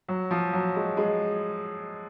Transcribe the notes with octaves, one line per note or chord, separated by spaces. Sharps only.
F#3
F3
F#3
G#3
G#3